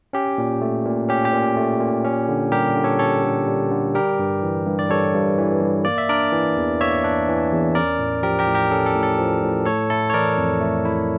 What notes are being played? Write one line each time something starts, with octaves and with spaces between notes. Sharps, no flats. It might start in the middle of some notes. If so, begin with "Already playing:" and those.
C#4 G4
A#2
A3
A#2
C#4 G4
G4
A#2
A3
A#2
C#4
D3
G3 G4 A#4
D3
A4 C#5
C#4 A4 C#5
D3
G3
D3
G3 G4 A#4
G2
E3
G2
D5
G3 A4 C#5
G2
E3
G2
A#3 D5
E5
D4 A#4 D5
E3
E2
A#3 C#5 E5
D4
E3
E2
C#4 A#4 D5
A2
F3 G4 A#4
G4 A#4
A2
G4 A#4
C#4 A4
A4
A2
A4
F3
A2
A3 A4 C#5
E4 A4
C#5
E3 A#4 D5
F2
A3
E4